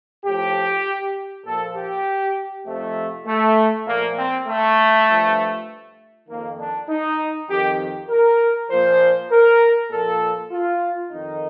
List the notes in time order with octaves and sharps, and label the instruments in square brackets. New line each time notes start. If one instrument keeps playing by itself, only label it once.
[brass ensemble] A2 F3 G4
A#2 F3 A4
G4
F2 C3 F3 A3
A3
A#2 F3 A#3
C4
A3
G2 F3
F2 D#3 A#3
D4
D#4
F2 D#3 G4
A#4
A#2 F3 C5
A#4
A#2 F3 A4
F4
F2 D#3 D#4